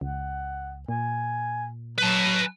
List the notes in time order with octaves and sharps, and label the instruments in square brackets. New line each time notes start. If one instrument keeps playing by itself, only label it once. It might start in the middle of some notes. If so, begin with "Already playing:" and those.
[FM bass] C#2 [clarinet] F#5
[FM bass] A#2 [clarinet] G#5
[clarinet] F#3 [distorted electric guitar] B4 A5